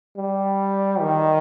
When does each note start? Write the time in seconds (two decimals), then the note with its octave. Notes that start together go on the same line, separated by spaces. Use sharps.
0.16 G3
1.01 D#3